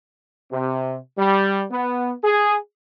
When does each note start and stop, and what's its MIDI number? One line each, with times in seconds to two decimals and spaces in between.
0.52 0.97 48
1.18 1.64 55
1.72 2.12 59
2.24 2.57 68